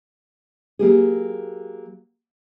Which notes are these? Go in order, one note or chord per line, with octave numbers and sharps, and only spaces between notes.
F#3 A#3 G4 G#4